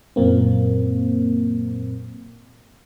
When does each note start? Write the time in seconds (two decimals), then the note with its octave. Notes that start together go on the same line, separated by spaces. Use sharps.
0.16 F#2 A#2 A#3 C4